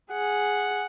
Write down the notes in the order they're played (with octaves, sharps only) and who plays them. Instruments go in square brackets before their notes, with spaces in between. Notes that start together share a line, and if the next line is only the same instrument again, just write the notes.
[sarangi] G#4 [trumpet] F#5